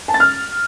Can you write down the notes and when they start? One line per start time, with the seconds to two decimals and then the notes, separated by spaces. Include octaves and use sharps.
0.08 A5
0.14 A6
0.20 F6